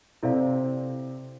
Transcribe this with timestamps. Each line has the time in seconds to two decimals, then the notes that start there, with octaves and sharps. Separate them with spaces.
0.23 C3 C4 E4 A4 D5 F5